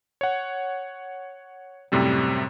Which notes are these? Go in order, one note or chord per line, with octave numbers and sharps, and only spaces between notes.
C#5 F#5
F#2 A2 C3 G3 C4